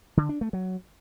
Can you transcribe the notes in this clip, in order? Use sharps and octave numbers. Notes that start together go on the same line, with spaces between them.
D3
D4
A3
F#3